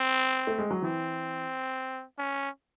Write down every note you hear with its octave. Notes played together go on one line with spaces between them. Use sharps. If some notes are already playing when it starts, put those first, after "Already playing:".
Already playing: C4
A3
G#3
F#3
E3 C4
C#4